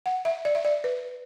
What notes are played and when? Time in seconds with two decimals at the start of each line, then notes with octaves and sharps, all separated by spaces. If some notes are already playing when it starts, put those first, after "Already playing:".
0.06 F#5
0.25 E5
0.45 D5
0.55 E5
0.65 D5
0.84 B4